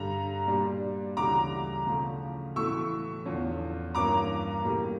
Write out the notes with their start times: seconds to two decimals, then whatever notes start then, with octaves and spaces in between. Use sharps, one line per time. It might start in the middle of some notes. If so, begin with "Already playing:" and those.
Already playing: G2 D3 G3 A#5
0.47 A#2 G3 D4
1.16 D2 C#3 E3 G3 A#5 D6
1.87 C#3 F3 A3 C#4
2.56 A2 E3 A3 C#6 E6
3.25 E2 D3 F3 C#4
3.94 G2 E3 A#3 C#4 A#5 D6
4.64 A2 G3 A#3